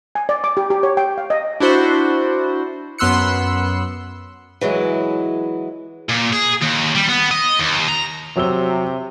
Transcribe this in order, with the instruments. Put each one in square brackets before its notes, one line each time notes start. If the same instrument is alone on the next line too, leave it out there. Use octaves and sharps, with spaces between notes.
[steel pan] G#5
D5
D6
G4
G4
C#5
G5
F5
D#5
[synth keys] D4 E4 F#4 C5
F#2 B3 C6 E6 F#6 C#7
[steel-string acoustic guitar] E3 F#3 G#3 E4
[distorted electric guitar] A#2
G#4
D#2
G3
B3
D#5
D#2
A#5
[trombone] C3 [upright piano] F#3 E6 G7